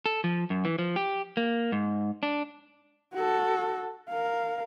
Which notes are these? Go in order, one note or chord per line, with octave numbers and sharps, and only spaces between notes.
A4
F3
F#2
E3
F3
G4
A#3
G#2
D4
F#4 A4
A#4 F5